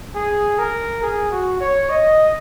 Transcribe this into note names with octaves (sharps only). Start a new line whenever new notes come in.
G#4
A#4
G#4
F#4
C#5
D#5